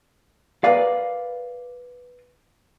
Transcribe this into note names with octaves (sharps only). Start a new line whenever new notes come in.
A#4 B4 D5 F5